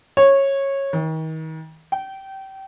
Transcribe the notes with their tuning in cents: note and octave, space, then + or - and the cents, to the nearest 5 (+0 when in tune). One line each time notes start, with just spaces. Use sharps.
C#5 -15
D#3 +35
G5 -25